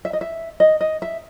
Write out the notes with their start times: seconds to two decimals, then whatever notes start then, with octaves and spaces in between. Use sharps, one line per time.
0.05 E5
0.13 D#5
0.21 E5
0.60 D#5
0.81 D#5
1.02 E5